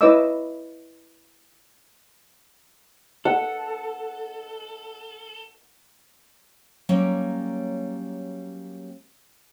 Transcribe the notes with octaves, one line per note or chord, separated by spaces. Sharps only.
E4 B4 C#5 D#5 D6 E6
A4 F#5
F#3 G3 A#3 C#4